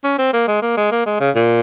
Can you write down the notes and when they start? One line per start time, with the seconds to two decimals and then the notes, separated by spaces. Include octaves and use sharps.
0.04 C#4
0.18 C4
0.33 A#3
0.48 G#3
0.62 A#3
0.77 G#3
0.91 A#3
1.06 G#3
1.20 C#3
1.35 A#2